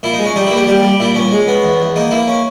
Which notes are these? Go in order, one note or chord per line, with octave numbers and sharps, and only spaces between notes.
A#2 E4
D#4
G#3
C#4
G3 D#4
A#3 E4
G4
G3 G4
G3
A#2 E4
A#2 C#4
G#3
B3
E2
E2
A#3 D#4
A#3 E4
C#4